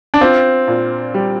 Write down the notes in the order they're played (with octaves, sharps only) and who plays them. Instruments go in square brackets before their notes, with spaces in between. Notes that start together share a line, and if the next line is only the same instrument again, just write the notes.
[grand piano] D4
[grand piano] C4 [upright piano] F4
[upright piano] A#2
G3